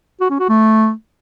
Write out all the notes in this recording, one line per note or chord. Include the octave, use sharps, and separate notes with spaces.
F#4
C#4
F#4
A3